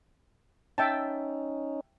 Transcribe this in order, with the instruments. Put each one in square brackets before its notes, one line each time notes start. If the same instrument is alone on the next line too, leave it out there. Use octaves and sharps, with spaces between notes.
[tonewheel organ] C#4 D#4 [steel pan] E5 G5 A5